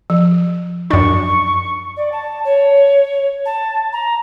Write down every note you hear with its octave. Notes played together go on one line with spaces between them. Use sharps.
F3
F#2 D4 C#6
D5
A5
C#5
A5
A#5